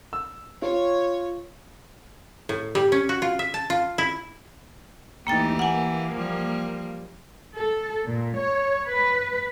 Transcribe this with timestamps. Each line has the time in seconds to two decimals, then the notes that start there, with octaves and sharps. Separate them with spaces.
0.13 E6
0.62 F4 C#5
2.49 A2
2.75 G3
2.92 C#4
3.09 F#4
3.22 F4
3.39 E5
3.54 A5
3.70 F4
3.98 E4
5.27 D2 E3 A#3 D#4 G4 G5 A6
5.59 A#3 F#5 G#5
6.12 F3 G3
7.55 A4
8.05 A#2
8.37 C#5
8.89 B4